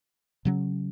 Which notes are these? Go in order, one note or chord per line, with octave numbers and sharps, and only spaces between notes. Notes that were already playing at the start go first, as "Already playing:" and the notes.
C#3 F#3 C#4